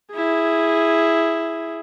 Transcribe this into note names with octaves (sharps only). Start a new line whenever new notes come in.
E4 G#4